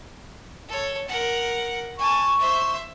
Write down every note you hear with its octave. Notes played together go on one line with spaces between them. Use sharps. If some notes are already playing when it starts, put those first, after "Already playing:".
A4 C#5
A#4 F#5
G#5 A5 C#6
C5 E5